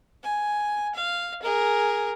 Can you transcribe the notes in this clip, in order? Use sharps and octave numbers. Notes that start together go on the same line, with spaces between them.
G#5
F5
G#4 A#4